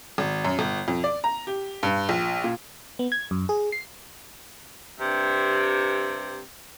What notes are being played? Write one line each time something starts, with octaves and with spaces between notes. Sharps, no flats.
G#1
F#2
G1
F2
D5
A#5
G4
G2
A#1
A#2
B3
G#6
F#2
G#4
C7
G2 C3